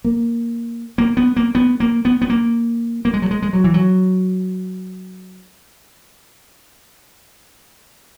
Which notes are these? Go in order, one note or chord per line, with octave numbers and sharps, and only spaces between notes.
A#3
A#3
B3
A#3
B3
A#3
B3
B3
A#3
A#3
G#3
F#3
G#3
G#3
F#3
E3
F#3